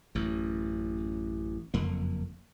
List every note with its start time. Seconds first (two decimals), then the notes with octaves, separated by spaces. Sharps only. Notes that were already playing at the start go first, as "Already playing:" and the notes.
0.15 A1 F#2
1.74 F#1 F2 A#3